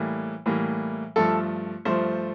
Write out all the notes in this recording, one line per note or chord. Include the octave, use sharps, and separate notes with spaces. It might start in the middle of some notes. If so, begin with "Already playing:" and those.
Already playing: A2 E3 G3 A#3
A2 E3 G3 A#3
G2 F3 A3 A4
G2 F3 A3 C5